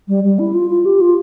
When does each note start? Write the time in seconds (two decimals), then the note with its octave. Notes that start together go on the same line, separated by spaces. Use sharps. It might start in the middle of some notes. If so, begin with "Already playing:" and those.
0.08 G3
0.24 G3
0.39 E4
0.54 F4
0.70 F4
0.85 G4
1.01 F4